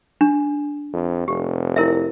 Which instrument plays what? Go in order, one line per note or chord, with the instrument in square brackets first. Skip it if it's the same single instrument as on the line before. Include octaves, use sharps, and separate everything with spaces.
[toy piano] D4
[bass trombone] F2
[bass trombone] F1 [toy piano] G4
[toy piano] E4 A#4 E5